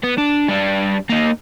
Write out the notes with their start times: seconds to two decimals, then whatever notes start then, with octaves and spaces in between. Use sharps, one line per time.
0.04 B3
0.18 D4
0.48 G3 D4
1.09 A#3 D#4